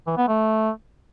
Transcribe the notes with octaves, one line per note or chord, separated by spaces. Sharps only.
E3
B3
A3